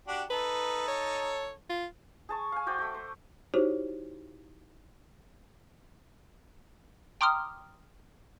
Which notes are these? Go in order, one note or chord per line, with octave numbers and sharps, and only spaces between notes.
D4 F#4 G4
D#4 A4 B4
C#5
F4
G#4 A5 C#6
F5 G#5
F#4 C5 D5 G5
A3 F#4
C5
D#4 E4 F#4 G4 C5 C#5
G5 A#5 C6 D6 D#6 F6